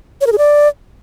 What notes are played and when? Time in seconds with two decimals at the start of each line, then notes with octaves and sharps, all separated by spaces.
0.21 C#5
0.27 A#4
0.32 G#4
0.38 D5